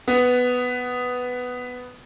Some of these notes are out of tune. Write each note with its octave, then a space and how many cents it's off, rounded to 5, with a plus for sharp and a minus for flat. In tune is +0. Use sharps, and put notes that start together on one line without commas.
B3 +5